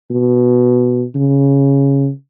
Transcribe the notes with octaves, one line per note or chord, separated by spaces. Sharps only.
B2
C#3